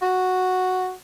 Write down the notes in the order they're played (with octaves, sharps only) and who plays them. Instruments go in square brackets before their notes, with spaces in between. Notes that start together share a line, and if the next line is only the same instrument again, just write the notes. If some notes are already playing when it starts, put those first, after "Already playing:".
[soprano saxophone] F#4